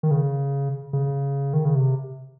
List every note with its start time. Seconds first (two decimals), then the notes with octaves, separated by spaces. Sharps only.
0.03 D#3
0.11 C#3
0.93 C#3
1.54 D#3
1.65 C#3
1.76 C3